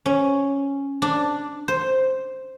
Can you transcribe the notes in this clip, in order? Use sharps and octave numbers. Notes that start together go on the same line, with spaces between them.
C#4
D4
C5